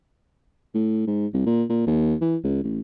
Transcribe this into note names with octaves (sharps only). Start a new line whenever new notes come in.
A2
G#2
C2
A#2
A#2
D#2
E3
C#2
A1